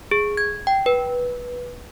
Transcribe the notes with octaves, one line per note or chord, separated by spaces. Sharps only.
G#4
G#6
G5
B4